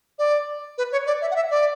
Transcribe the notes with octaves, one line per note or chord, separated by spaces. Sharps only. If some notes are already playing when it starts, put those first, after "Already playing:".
D5
B4
C#5
D5
E5
F#5
E5
D5